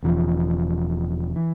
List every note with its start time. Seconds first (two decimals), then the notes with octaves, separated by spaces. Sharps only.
0.03 E1 E2 C#3 F3
1.36 E3